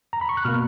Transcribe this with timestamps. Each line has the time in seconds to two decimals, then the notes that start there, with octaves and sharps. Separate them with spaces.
0.13 A#5
0.21 B5
0.29 C#6
0.37 F#6
0.45 B2 A#3 F6